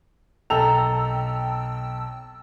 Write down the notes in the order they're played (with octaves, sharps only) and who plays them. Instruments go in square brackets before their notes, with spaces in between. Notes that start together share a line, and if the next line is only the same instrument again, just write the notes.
[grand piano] B1 A4 F7 [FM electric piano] G5 A5 E6 [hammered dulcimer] A#5